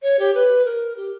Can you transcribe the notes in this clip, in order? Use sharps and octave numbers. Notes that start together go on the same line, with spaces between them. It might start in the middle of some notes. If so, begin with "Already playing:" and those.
C#5
G4
B4
A#4
G4